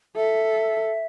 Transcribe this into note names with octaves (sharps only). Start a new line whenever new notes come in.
A4 E5